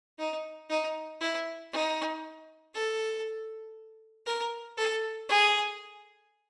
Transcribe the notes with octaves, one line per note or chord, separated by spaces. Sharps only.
D#4
D#4
E4
D#4
A4
A#4
A4
G#4